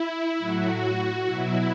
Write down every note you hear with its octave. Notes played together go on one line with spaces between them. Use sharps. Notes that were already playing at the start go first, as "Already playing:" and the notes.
Already playing: E4
A2 F#3 F#4
B2 F#3 E4